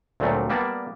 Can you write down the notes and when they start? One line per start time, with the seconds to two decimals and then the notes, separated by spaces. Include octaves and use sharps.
0.20 D2 A#2 F#3 G3 A3 C4
0.50 G3 A#3 B3 D5 A5